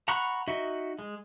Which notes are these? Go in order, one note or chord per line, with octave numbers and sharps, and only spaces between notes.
F#5 A#5 B5 C#6 F#6
D#4 F#4 D#5 E5
G#3